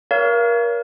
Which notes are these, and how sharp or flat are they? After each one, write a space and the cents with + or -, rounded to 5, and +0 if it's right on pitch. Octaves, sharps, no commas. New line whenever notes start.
A#4 +25 C#5 +35 F5 -30